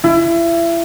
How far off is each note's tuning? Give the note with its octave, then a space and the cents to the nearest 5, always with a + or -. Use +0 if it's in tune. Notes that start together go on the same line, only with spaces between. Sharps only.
E4 +30